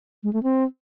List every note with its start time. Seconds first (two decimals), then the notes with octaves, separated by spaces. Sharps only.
0.23 G#3
0.33 A3
0.43 C4